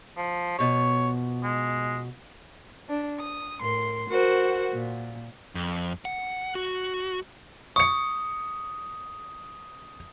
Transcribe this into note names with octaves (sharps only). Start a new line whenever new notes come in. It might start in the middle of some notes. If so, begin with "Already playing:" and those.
F3
B2 F3 C#5
G#3
D4
D#6
A2 A#4 C6
F#4 A#4 C5 F#5
A#2
F2
F#5
F#4
C#6 D#6 C#7